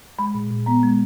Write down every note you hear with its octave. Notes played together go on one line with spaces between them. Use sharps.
G#3 B5
A#2
A#2
B3 A#5
G#3